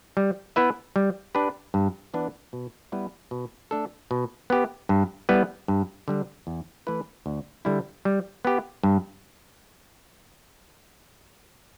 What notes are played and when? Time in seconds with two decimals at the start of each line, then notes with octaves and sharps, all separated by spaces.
0.17 G3
0.56 B3 E4 B4 E5
0.96 G3
1.35 D4 G4 B4
1.74 G2
2.14 E3 B3 D4 B4
2.53 B2
2.92 G3 B3 E4 B4
3.31 B2
3.71 A3 D4 A4
4.11 B2
4.50 B3 G4
4.89 G2
5.29 G3 B3 E4 B4
5.68 G2
6.08 D3 G3 D4
6.47 E2
6.87 E3 A3 E4 B4
7.26 D2
7.65 D3 G3 E4
8.05 G3
8.45 B3 G4
8.84 G2